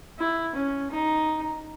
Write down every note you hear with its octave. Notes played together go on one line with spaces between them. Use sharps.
E4
C#4
D#4